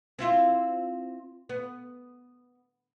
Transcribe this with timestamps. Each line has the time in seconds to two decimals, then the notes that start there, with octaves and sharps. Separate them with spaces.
0.19 C4 E4 F4
1.49 B3